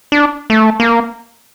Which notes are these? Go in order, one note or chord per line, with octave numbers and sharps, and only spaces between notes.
D4
A3
A#3